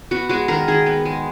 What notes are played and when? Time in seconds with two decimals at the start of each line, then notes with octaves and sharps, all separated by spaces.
0.11 B3 F#4
0.29 G#3 F#4
0.48 D#3 A#4
0.68 D#3 G#4
0.86 B3
1.05 G#3